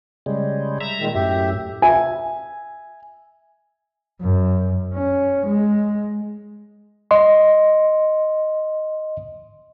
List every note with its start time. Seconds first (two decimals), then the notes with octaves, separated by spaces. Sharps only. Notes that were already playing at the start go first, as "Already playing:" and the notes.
0.26 C#3 G3 G#3
0.80 E5 A#5
0.99 A#2 D#3 G#3
1.14 F#2 A2 G4 E5
1.82 E5 G#5
4.21 F#2
4.94 C#4
5.46 G#3
7.11 D#5 C6